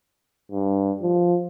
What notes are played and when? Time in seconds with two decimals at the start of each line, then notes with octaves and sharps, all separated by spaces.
0.52 G2
1.02 F3